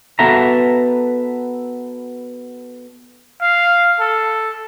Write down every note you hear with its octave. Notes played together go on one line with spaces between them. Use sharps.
B3 F#4 A4 B4 E5 A#5
F5
A4